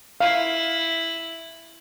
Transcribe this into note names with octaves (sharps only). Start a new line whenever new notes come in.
E4 F5